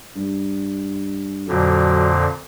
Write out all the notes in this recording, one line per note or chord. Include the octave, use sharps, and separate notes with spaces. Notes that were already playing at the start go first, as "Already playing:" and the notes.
G2
F2 A#2 D3 F#3